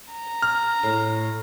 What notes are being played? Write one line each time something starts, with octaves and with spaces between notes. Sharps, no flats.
A#5
F6
A2